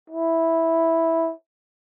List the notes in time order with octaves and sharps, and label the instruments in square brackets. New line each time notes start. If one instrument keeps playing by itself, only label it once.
[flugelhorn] E4